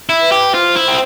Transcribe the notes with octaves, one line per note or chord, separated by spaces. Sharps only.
E4
B4
G4
F4 C5
E4
C4